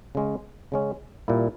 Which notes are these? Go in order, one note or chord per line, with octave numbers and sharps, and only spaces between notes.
C#3 G#3 C#4
C#3 G#3 C#4
A#2 G3 A#3 E4